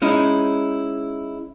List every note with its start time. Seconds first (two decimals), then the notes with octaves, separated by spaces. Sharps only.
0.02 G#3 C#4 D#4 E4